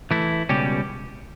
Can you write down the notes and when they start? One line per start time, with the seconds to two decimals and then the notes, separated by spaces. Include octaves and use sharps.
0.11 E3 A3 E4
0.49 C#2 B2 G3 C#4 G4